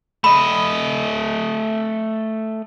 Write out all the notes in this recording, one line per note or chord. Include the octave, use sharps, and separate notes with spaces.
A3 D#5 B5